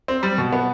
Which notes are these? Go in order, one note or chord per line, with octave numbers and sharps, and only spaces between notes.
C4
G3
B2
B3